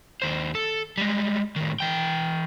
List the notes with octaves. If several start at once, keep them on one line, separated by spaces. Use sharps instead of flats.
D#2 C5
A4
G3 G#3
A2 D#3
E3 G5